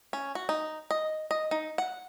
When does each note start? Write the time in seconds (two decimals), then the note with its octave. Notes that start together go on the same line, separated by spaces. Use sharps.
0.13 C#4
0.35 F#4
0.49 D#4
0.91 D#5
1.31 D#5
1.51 D#4
1.78 F#5